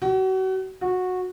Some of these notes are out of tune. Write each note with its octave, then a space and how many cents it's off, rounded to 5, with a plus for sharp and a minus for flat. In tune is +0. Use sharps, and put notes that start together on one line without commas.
F#4 +35
F#4 -15